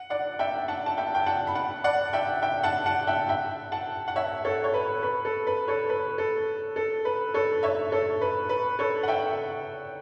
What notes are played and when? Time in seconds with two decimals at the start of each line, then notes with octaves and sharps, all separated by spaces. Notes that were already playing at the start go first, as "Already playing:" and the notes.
Already playing: F#5
0.10 D5 F#5
0.39 E5 G5
0.68 F#5 A5
0.86 A5
0.97 E5 G5
1.15 G5
1.26 F#5 A5
1.47 B5
1.55 F#5 A5
1.84 D5 F#5
2.13 E5 G5
2.42 E5 G5
2.63 F#5 A5
2.86 F#5 A5
3.07 E5 G5
3.29 E5 G5
3.72 F#5 A5
4.08 F#5
4.16 C#5 E5
4.45 A4 C#5
4.64 C#5
4.74 B4
5.03 B4
5.25 A4
5.47 B4
5.68 A4 C#5
5.89 B4
6.18 A4
6.76 A4
7.05 B4
7.34 A4 C#5
7.63 C#5 E5
7.92 A4 C#5
8.21 B4
8.49 B4
8.79 A4 C#5
9.03 F#5
9.08 E5 G5